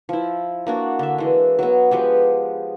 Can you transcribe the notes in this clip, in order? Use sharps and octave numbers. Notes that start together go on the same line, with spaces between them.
F3 E4
A#3 D4 F#4
D3 E5
E3 G#3
F#3 B3
F3 G#3 B3 G4